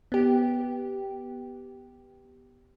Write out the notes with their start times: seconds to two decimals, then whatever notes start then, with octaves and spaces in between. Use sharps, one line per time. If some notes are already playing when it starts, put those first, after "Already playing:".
0.12 B3 G4